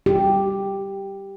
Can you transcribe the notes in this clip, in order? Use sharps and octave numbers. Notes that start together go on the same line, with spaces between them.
G4